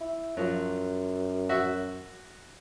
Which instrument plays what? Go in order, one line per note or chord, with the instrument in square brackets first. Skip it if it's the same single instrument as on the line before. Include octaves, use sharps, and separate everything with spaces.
[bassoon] E4
[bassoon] F#2 [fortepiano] F3 F#3
[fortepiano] F#4 E5